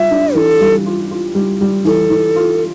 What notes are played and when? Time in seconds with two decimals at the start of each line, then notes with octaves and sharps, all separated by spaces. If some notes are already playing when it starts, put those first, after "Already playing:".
Already playing: G3 F4 E5
0.11 D4
0.35 E3 A4
0.60 G3
0.86 F4
1.11 F4
1.35 G3
1.61 G3
1.85 E3 A4
2.10 E3
2.36 F4